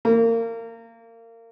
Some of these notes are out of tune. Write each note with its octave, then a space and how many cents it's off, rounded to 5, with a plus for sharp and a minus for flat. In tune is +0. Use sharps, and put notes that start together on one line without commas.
A#3 -30